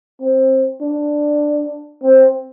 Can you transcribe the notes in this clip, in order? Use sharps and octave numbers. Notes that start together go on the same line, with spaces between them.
C4
D4
C4